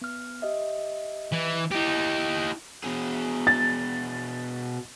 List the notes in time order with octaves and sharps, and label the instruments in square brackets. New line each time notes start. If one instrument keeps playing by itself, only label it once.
[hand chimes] B3 F6
G4 D#5 E5
[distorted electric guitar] E3
[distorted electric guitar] D#4 G4 [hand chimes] E4 A#6
[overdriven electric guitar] B2 G#4
[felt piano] A6